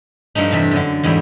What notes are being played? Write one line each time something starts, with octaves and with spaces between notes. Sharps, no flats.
G2 F3 A3 D#4
E2 C3 D4 E5
F#2 D3
E2 G#2 G3 E4